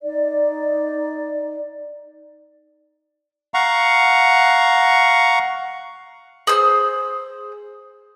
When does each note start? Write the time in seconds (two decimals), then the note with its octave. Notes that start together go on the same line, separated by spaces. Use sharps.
0.01 D#4 D5
3.54 F5 F#5 A#5 C#6
6.47 G#4 C5 E6